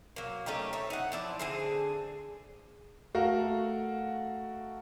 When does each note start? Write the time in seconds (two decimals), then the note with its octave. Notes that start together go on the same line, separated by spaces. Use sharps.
0.16 F#3 A#3
0.46 A3 C#4 D#4 G4
0.73 C#5 E5
0.90 D#4 F#5
1.12 F3 E4 D5
1.39 D3 C4 G#4
3.15 A3 F#4 A#4 F5